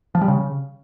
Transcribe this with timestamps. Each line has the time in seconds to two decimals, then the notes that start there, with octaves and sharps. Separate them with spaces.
0.15 F3
0.21 G3
0.28 C#3